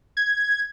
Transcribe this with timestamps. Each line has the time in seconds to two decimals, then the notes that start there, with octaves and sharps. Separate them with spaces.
0.17 G#6